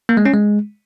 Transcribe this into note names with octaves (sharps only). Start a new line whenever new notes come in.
A#3
G#3
C#4
G#3